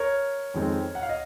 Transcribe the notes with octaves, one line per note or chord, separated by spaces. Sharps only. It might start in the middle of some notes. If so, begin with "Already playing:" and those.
Already playing: A#4 C#5
F2 D#3 G#3 C4
F#5
F5
D#5